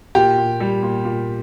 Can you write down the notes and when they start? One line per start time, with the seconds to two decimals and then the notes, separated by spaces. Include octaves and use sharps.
0.15 A#2 G4
0.38 A#2
0.60 G3
0.83 A#2
1.05 A#2